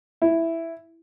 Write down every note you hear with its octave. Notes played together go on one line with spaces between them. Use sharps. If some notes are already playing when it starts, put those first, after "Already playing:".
E4